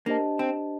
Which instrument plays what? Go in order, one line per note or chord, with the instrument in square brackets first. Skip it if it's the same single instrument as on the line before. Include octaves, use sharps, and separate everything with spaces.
[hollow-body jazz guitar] A#3 [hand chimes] D4 G4 C5 D#5 A5
[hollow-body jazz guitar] C4